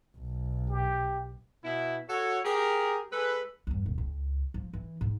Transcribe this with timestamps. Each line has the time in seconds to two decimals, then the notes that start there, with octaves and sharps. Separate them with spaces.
0.17 B1
0.70 G4
1.65 B2 E4
2.10 F#4 A4 C#5
2.45 G4 G#4 A#4
3.13 G#3 G#4 A4 B4
3.67 E2 G2
3.86 D#1
3.98 C#2
4.54 F3
4.73 E3
5.01 G#2